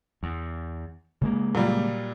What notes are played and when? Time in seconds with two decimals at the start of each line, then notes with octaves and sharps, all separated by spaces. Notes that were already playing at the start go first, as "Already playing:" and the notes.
0.23 E2
1.21 C#3 G#3 A#3
1.55 A#2 F#3 G3